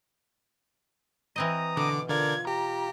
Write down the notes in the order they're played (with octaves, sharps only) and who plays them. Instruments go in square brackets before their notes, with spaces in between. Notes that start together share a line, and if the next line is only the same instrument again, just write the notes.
[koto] E3 C4 D#5 [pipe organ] A#5 D#6
[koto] B2 [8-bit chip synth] D3 [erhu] D6
[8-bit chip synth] D3 A#4 D5 [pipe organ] F4 [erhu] G#6
[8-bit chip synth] G4 [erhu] A#5